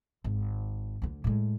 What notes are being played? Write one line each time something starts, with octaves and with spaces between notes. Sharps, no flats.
G#1
D2 D3
A2 G#3